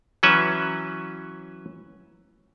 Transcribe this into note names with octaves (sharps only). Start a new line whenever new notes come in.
E3 F#3 C#4 B4 E5